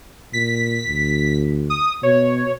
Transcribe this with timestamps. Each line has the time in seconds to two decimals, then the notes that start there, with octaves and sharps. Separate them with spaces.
0.33 A#2 B6
0.88 D2
1.70 D#6
2.03 B2 C#5